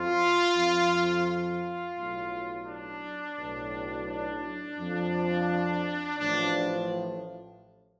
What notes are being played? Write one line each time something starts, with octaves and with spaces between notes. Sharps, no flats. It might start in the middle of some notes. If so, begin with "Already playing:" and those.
Already playing: F2 F3 F4
F2 F3
F4
B1 A2 F#3
D4
B1 A2 F#3
D4
F2 F3
A1 A2 F3 D4